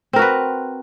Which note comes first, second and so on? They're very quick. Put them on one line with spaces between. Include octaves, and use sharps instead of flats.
C4 A#4 F#4 B4